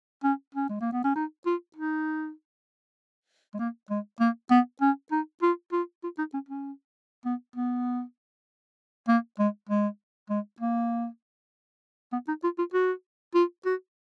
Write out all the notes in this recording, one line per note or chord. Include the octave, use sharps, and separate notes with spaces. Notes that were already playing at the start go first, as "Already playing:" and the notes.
C#4
C#4
G#3
A#3
B3
C#4
D#4
F4
D#4
G#3
A#3
G#3
A#3
B3
C#4
D#4
F4
F4
F4
D#4
C#4
C#4
B3
B3
A#3
G#3
G#3
G#3
A#3
B3
D#4
F4
F4
F#4
F4
F#4